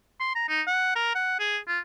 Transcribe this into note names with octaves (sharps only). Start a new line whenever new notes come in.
C6
A#5
D#4
F#5
A#4
F#5
G#4
F4